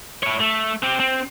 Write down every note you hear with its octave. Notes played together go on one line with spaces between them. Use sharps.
E4 C#5
A3
C4 G4
C4